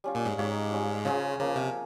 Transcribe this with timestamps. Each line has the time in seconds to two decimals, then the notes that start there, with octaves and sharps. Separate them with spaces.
0.04 G3 C#4 F4
0.15 A#2
0.26 G#2
0.38 G#2 D#4 G4 C#5 F5
0.71 G3 C#4 F4
1.05 C#3 C#4 F4 G#4 C5
1.39 C#3 F3 A#3 C#4
1.56 C3